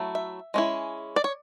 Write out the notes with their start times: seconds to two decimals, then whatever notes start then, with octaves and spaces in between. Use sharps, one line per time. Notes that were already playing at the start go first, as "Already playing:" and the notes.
Already playing: F#3 A3 E4
0.15 E5
0.54 G#3 C#4 E4
1.16 D5
1.24 C#5